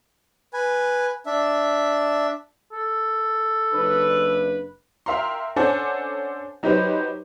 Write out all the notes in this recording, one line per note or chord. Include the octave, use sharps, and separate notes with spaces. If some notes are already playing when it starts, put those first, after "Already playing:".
B4 G#5
D4 E5
A4
F#1 D4 B4
A#4 E5 F5 G5 A#5 C6
C#4 D4 A4 C5 F#5 G#5
F#3 D#4 G4 B4 C5